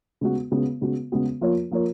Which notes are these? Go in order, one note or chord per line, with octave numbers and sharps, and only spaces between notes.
C#3 G#3 B3 F#4
C#3 G#3 B3 F#4
C#3 G#3 B3 F#4
C#3 G#3 B3 F#4
F3 A#3 F4 A#4 C#5
F3 A#3 F4 A#4 C#5